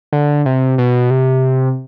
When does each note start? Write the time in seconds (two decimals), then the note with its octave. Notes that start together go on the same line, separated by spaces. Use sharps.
0.13 D3
0.45 C3
0.78 B2
1.10 C3